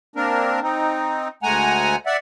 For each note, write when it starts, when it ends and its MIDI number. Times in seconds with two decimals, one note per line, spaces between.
0.16 0.60 58
0.16 0.60 60
0.16 0.60 62
0.16 0.60 70
0.62 1.28 60
0.62 1.28 63
1.43 1.96 38
1.43 1.96 56
1.43 1.96 57
1.43 1.96 78
1.43 1.96 80
1.43 1.96 82
2.06 2.17 74
2.06 2.17 76
2.06 2.17 78